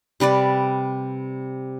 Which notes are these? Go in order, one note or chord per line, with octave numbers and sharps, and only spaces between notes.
C3 G3 B4 D5